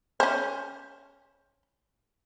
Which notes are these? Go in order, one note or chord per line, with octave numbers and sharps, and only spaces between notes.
C#4 C5